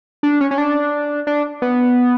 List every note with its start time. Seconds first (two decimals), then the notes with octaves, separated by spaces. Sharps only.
0.23 D4
0.41 C#4
0.51 C#4
0.58 D4
1.27 D4
1.62 B3